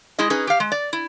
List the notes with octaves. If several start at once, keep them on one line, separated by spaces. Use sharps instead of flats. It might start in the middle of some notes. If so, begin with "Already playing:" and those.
G#3 E4 G#4 D#5
C#4 D#4 G#4 B4
G4 F5
G#3
D5
E4